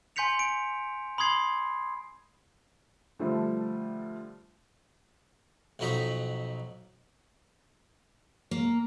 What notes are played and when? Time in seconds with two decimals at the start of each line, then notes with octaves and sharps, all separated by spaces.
0.16 G#5 C6 G6 B6 C#7 F7
0.39 D7
1.18 B5 C6 D#6 G#6 C7
3.19 D3 F3 G3 A3
5.79 B1 F2 F#3 D#4 B5
8.51 A#3